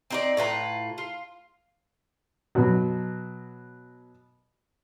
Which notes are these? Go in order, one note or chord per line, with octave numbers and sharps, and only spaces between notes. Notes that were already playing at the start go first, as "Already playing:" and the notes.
C4 D#4 D5
A2 F4 B4 A#5
F4
B2 F#3